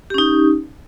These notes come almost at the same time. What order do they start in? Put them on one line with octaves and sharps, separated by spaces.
G4 C#4 D#4